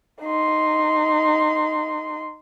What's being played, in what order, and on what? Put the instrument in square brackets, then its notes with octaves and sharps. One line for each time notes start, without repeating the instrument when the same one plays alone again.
[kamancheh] D#4 C6